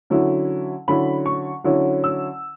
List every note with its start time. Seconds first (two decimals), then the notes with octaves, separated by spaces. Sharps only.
0.10 D3 F#3 C#4 E4
0.88 D3 F#3 C#4 E4 B5
1.26 C#6
1.64 D3 F#3 C#4 E4
2.04 E6